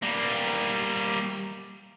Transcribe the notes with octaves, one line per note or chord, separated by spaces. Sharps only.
G3 A#3